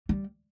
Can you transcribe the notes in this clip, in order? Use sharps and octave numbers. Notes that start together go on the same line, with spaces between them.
G3